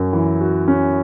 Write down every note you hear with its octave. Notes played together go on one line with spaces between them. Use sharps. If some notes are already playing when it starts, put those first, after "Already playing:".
Already playing: F#2 C#4 F#4
E3
F#4
C#4